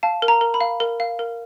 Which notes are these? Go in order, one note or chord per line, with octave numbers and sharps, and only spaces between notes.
F5 A5
A#4
A#5
A#4
B5
F5
A#4
F5
A#4